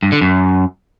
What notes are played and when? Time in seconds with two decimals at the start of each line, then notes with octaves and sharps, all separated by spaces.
0.03 G2
0.12 D3
0.21 F#2